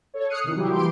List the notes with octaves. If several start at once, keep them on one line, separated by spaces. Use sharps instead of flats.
A4 C#5
D#6 F6 F#6 C7 C#7 D#7
C3 D#3 E3
F#3 G3 E4 G4
E3 A#3 G4 C6 D7